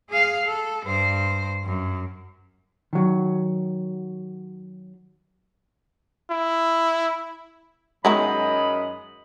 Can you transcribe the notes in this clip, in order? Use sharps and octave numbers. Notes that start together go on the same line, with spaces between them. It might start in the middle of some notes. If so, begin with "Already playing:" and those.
G#4 F5
A4
G2 C5
F#2
D#3 F#3
E4
F#2 D#3 F#3 G#3 E4 D#5 B5